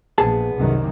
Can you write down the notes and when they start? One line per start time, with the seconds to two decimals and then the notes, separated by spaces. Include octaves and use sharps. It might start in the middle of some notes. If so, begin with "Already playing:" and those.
0.18 A#1 B3 G#4 A5
0.55 C2 F#2 D#3